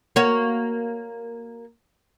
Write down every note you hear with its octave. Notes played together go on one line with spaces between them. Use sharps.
A#3 F#4 C#5